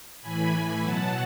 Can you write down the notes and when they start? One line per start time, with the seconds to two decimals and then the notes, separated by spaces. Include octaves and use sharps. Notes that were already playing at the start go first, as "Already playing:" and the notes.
0.22 A2 E3 G#5 B5
0.52 G#5 B5
0.82 B2 F#3 F#5 A5